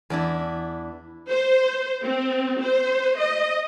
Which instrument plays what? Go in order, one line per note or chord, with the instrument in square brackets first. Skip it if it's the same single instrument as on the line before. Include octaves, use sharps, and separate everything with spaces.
[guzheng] E2 D4 E4
[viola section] C5
C4
C5
D#5